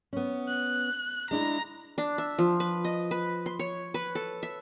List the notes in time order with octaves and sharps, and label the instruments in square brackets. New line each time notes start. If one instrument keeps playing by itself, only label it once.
[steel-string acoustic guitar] B3 C#4
[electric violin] F#6
[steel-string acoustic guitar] G#3 D4 E4 [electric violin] A#5
[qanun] D4
E5
F3
B4
D#5
B4
C6
C#5
B4
A4
E5